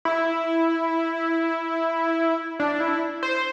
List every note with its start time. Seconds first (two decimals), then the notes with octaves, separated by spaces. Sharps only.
0.05 E4
2.60 D4
2.80 E4
3.23 C5